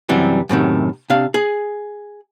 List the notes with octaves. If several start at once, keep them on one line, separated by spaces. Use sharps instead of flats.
F#2 C3 E3 G3
F#2 A2 C3 D#3
C3 D4 F5
G#4